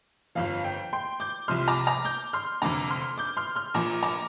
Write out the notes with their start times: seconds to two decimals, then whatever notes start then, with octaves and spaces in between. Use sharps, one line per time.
0.35 G1 F2 F3 F5
0.64 G5
0.93 G5 C6
1.20 D6 G6
1.48 C2 C3 F3 C6 F6
1.68 A#5 D6
1.87 A#5 D6
2.05 D6 G6
2.33 C6 F6
2.62 F1 F2 D3 A#5 D6
2.90 C6 F6
3.18 D6 G6
3.37 C6 F6
3.56 C6 F6
3.74 A#1 A#2 F3 A#5 D6
4.03 A#5 D6